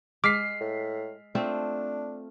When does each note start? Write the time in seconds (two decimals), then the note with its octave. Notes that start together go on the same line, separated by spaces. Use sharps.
0.24 G#3 D6 F6 B6 C7
0.60 A2
1.35 A3 C4 D4 F4